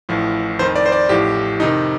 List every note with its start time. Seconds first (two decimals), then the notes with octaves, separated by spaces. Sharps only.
0.09 A1 A2 F3
0.59 F2 D#3 C5
0.76 D5
0.86 C5
0.92 D5
1.09 A1 A2 F3 G4
1.59 F2 C3 D#3 D#4